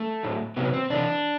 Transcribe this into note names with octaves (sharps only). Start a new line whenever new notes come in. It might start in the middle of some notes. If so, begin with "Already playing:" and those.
Already playing: A3
A2 F#3
C3 F#3 B3
C4
C3 E3 D4